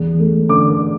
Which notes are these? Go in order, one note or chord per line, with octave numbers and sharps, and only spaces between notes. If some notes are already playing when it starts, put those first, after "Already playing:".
Already playing: E2
A3
D3 D6